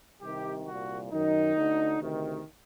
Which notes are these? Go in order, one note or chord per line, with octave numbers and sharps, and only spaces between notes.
C2 C3 D#3 G4
C2 A#2 F#4
F#2 D#3 D#4
D2 D3
D2 C3 D#3